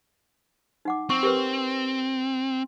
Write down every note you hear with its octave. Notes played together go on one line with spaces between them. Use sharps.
D#4 F#5 D6
C4 C#6
G4 A#4 B4